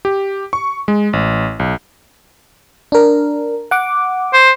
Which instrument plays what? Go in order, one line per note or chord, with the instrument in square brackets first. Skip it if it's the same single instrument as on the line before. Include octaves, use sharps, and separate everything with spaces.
[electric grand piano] G4
C#6
G#3
A1
B1
[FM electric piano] D4 A#4
F#5 D6
[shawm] C5